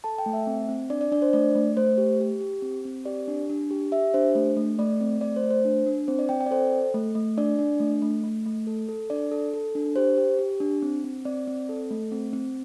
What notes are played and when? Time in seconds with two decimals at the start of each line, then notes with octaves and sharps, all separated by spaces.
0.04 A4 A5
0.18 G5
0.26 A3
0.33 E5
0.47 C4
0.69 C4
0.90 D4 D5
1.01 D5
1.12 D4 D5
1.22 C5
1.33 A3 D5
1.55 A3
1.77 A3 C5
1.98 G4
2.20 G4
2.41 G4
2.62 C4
2.85 C4
3.06 G4 D5
3.28 D4
3.50 D4
3.71 G4
3.92 G4 E5
4.14 D4 C5
4.35 A3
4.57 A3
4.79 A3 D5
5.00 C4
5.21 A3 D5
5.36 C5
5.43 A3
5.51 C5
5.65 D4
5.86 D4
6.08 C4 C5
6.19 D5
6.29 C4 G5
6.41 G5
6.46 D5
6.51 A4 C5
6.72 A4
6.94 A3
7.15 A3
7.38 D4 D5
7.59 D4
7.80 A3
8.02 A3
8.23 A3
8.46 A3
8.67 A4
8.89 A4
9.10 D4 D5
9.32 A4
9.54 A4
9.75 D4
9.96 G4 C5
10.18 G4
10.39 G4
10.60 D4
10.82 C4
11.04 C4
11.25 C4 D5
11.48 C4
11.69 A4
11.91 A3
12.12 C4
12.33 C4